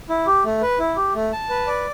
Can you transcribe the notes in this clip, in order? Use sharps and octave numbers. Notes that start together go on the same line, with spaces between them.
E4
G4
A3
B4
E4
G4
A3
A5
B4
D5